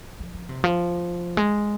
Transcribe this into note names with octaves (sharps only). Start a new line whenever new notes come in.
F3
F3
C3
F3
G#3